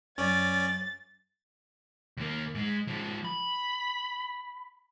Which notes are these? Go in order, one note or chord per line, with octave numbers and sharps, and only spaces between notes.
F#2 C#4 D5 A6
D#2 A#3
G#2 G#3
F3 G#3
B5